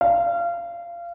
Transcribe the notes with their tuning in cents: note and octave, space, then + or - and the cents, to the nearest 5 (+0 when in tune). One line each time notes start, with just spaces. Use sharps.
F5 -25